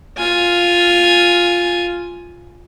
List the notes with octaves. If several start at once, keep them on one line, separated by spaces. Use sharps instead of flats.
F4 G#5